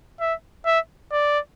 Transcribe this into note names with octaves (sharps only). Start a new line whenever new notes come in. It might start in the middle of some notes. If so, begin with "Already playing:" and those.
E5
E5
D5